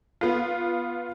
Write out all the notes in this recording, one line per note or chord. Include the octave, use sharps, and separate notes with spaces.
B3 F4